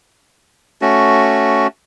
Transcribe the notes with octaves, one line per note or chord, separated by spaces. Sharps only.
A3 C#4 F#4